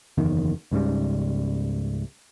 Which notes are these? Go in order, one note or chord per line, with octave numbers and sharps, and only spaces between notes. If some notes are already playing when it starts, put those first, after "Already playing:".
F#1 E2 D#3
C#2 G#2 C#3 G3